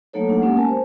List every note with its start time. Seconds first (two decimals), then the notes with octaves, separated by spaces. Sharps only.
0.13 F#3 A3 A#3 D#4 A4 C#5
0.29 D4 F#5
0.42 G#3 A#3 B3 C#4 G4
0.57 A#4 G#5 A5
0.68 C5